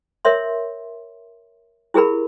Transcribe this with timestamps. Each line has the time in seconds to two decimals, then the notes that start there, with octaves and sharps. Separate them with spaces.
0.25 A#4 C#5 E5 C6
1.94 E4 G4 G#4 A#4 B5